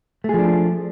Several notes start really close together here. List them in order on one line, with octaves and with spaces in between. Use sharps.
A3 G#4 F3 D4